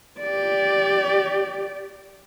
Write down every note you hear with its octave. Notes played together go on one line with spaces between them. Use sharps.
G4 D5